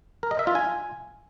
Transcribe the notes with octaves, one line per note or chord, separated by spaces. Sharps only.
A#4
D#5
E5
F4
G#5